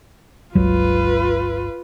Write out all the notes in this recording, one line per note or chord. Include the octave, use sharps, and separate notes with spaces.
G1 C#2 F#3 F4 B4